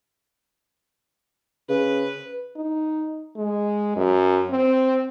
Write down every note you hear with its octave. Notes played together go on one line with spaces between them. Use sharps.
C#3 B4
D#4
G#3
F#2
C4